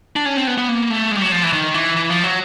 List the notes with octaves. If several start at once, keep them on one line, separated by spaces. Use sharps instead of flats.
D4
C#4
C4
B3
B3
A#3
A3
G#3
G3
F#3
F3
E3
D#3
E3
E3
F3
F#3